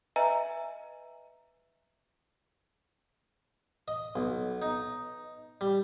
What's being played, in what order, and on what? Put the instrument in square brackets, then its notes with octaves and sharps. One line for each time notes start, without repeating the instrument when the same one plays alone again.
[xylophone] B4 D#5 E5 G#5 A#5
[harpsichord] D#5
B1
D#4
G3